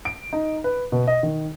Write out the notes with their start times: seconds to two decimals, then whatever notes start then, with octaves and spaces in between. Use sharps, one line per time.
0.05 D7
0.33 D#4
0.64 B4
0.92 B2
1.07 D#5
1.23 D#3